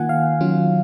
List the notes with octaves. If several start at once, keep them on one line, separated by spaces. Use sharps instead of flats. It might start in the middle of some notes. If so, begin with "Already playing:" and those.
Already playing: D#3 A#3 F4 F#5 G#5
F5
D#3 F#3 C#4 F4